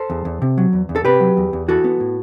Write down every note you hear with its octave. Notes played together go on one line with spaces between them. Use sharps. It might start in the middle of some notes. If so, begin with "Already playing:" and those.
Already playing: A4 C5
E2
E2
C3
F#3
E2
E2
A4
C3 G4 B4
F#3
E2
E2
E3 F#4 A4
B3
A2